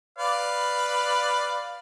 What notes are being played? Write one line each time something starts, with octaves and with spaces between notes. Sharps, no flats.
B4 D5 F5